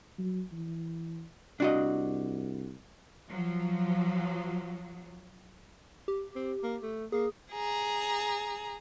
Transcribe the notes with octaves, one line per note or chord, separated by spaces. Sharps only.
F#3
E3
C2 D4 F#4 D#5
F3 F#3
G4
C4
A#3
A3
A#3 G#4
G#4 A#5